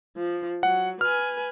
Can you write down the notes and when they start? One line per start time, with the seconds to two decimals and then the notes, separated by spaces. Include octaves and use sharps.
0.17 F3
0.63 F#3 F#5
1.01 B4 G#5 F6